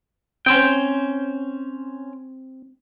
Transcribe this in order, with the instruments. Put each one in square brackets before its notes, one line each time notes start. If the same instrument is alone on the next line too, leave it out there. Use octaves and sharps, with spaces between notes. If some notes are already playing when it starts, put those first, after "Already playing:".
[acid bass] C4 [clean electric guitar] C#4 C5 G5